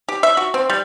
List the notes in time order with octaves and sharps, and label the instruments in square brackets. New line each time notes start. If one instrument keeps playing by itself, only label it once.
[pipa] G4
E5
F#4
C4
G3